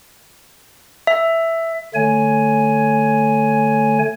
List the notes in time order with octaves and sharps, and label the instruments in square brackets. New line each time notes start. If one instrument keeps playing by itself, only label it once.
[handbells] E5
[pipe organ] D3 A3 C#5 G#5